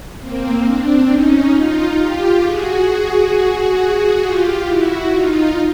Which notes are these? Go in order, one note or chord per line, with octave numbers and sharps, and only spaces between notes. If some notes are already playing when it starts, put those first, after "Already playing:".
A#3 C4
C4 D4
C#4 D#4
D#4 F4
F4 G4
F#4 G#4
F4 G4
E4 F#4
D#4 F4